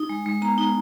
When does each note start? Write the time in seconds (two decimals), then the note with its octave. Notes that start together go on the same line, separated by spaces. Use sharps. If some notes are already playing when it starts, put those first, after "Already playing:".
Already playing: D#4
0.09 G#3
0.26 G#3
0.42 B3 A#5
0.58 D#4